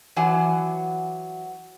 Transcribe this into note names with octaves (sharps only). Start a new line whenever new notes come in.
E3 F#3 F#5 G#5